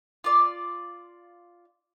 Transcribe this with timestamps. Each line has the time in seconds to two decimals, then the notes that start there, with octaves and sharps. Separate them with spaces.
0.24 F4 D5